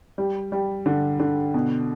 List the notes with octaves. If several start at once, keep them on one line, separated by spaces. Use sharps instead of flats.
G3
G3
D3
D3
B2